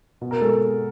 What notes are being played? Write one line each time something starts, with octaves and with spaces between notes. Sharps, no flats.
B2
A#4
G#3 A4